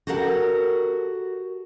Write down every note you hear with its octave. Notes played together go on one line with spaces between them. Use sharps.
F#4 G4 A4 A#4 F5 F#5